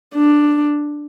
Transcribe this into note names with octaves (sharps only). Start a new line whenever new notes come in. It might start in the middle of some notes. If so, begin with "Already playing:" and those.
D4